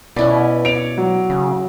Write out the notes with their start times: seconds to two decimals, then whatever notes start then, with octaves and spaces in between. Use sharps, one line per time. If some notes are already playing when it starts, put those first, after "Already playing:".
0.16 B2 C#4 E4 B4 D5
0.65 C#5 D5 D7 F7
0.98 F#3
1.30 C#3